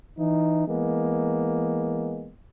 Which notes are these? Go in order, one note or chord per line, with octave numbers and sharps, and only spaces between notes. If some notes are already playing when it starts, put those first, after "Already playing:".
E3 D#4
E3 G#3 A#3 B3